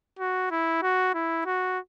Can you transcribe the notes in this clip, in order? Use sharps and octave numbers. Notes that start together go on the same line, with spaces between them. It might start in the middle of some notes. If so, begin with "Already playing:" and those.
F#4
E4
F#4
E4
F#4